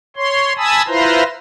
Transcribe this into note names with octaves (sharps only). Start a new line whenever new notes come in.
C#5 C6
G#5 A5 B5 D#6 E6
E4 F4 B4 C5 A#5 C6